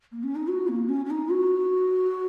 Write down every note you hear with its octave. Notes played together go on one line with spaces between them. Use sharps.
A#3
C#4
D#4
F#4
A#3
C#4
C#4
D#4
F#4